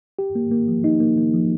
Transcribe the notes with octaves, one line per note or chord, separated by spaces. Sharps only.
G4
A#3
A#3
F3
D#4
A#3
A#3
F3